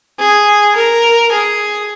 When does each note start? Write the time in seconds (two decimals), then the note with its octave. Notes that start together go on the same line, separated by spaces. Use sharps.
0.19 G#4
0.76 A#4
1.32 G#4